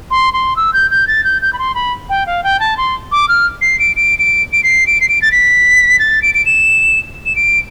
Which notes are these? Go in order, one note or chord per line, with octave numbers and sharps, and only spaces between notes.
C6
C6
E6
G6
G6
A6
G6
G6
B5
C6
B5
G5
F5
G5
A5
C6
D6
F6
C7
D7
D7
D7
D7
C7
D7
C7
D7
A6
B6
A6
D7
D7
E7
E7
D7